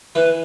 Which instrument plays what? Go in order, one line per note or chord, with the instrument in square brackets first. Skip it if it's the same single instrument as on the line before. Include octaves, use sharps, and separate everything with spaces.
[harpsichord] E3 [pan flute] B4